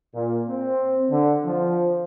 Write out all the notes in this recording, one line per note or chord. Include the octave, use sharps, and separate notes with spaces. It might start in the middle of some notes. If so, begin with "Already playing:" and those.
A#2
C4
D3
F3